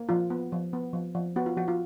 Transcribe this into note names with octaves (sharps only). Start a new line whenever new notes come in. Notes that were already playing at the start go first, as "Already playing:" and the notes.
Already playing: A#3
F3 F4
B3
F3
B3
F3
F3
B3 F#4
F4
F3 F#4
F4